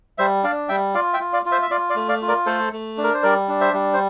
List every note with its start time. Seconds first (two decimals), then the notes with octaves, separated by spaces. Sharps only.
0.18 G3 C5 E5
0.44 D4 D5 F5
0.69 G3 E5 G5
0.94 F4 D5 F5
1.13 E5 G5
1.20 F4
1.33 D5 F5
1.45 F4
1.52 C5 E5
1.62 E5
1.70 F4 D5 F5
1.90 D5 F5
1.96 A3
2.09 D5 F5
2.22 F4
2.28 A#4 D5
2.46 A3 A4 C5
2.72 A3
2.98 D4
3.04 A#4
3.14 C5
3.23 G3 A#4 D5
3.48 D4
3.61 C5 E5
3.74 G3
3.94 C5